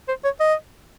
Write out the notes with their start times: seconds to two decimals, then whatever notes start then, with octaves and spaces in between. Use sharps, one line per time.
0.08 C5
0.24 C#5
0.40 D#5